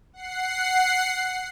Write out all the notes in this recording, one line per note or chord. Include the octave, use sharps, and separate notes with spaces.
F#5 C7